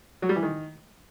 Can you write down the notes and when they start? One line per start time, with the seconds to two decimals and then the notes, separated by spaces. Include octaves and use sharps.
0.22 F#3
0.29 G3
0.36 E3
0.43 D#3